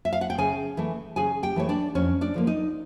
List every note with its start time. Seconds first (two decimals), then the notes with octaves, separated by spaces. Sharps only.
0.05 E5
0.13 F5
0.21 F#5
0.30 G5
0.38 C#3 G#4 G#5
0.77 E3 A3
1.16 C#3 G#4 G#5
1.43 G4 G5
1.56 E3 A3 C#5
1.69 D4 D5
1.95 F2 C#4 C#5
2.21 D4 D5
2.34 D3 F3 A#3
2.47 D#4 D#5